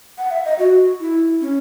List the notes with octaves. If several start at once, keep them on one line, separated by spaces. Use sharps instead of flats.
F#5
E5
D#5
F#4
E4
C#4